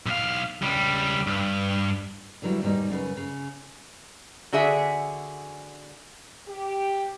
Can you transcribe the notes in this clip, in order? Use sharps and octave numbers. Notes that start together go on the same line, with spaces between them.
B1 F5
C#2 G3
G2
D3 E3 F#3 G3 E4
D#2 G#2 B2 G3 D#4
F#2 C#3 G4 B4
C#3
D3 F#4 G#4 E5 F#5
G4